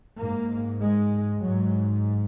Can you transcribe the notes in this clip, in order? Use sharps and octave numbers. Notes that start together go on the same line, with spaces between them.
G#2 A#3
G#3
G#2 F#3